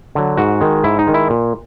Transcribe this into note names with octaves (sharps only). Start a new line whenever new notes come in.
D3 F#3
G#2 F#4
D#3 G#3
G#2 E4
D#4
D#3 G#3
E4
A#2